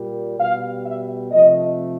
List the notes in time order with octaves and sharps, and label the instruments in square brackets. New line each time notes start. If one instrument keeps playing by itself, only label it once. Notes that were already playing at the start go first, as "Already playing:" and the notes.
Already playing: [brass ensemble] A#2 G3
B2 G3 F5
E5
C3 F3 A3 D#5